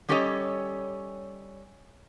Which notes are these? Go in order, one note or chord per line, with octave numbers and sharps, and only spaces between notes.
G3 C#4 G4 A4 C#5 D#5